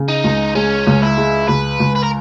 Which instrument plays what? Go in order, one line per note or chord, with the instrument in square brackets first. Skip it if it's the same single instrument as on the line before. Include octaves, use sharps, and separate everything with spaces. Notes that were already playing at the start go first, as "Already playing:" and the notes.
Already playing: [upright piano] C#3
[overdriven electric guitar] D#4
[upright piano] C#2
[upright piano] G#3 [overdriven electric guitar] C#4
[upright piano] C#2
[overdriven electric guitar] E4
[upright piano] G#3
[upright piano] C#2 [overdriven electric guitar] B4
[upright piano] C#2
[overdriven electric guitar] B4
A#4